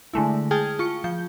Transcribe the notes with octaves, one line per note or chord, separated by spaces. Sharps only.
D3 G#3 A3 E4
G#4 G5 A5 D#6 F6 G#6
F4 C#6 C#7
F3 G6